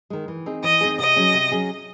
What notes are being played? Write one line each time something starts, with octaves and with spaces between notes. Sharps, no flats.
D#3 G#3
E3
C4 D#4 G#4
E3 D#5
C4 D#4 G#4
C3 D#5
F#3 C#4 G#4
C3
F#3 C#4 G#4